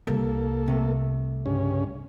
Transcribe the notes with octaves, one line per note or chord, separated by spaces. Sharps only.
C2 A#3 A4
C3 A3
G2 C#3 C#4